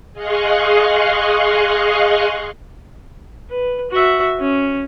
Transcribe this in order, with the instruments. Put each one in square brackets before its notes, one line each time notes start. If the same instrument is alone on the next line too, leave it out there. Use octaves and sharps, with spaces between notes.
[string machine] G#4 D#5 F5 C6 C#6 F#6
[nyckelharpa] B4
F#4 E5
C#4